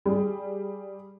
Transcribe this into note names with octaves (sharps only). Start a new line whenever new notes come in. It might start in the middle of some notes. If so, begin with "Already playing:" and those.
G3 G#4